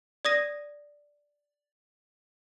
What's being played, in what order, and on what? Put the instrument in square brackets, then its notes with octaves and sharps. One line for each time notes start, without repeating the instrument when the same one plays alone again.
[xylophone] D5 D#6 A#6 D#7